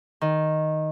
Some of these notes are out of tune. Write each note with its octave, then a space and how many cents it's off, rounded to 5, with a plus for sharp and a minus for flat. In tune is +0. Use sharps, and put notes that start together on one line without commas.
D#3 +0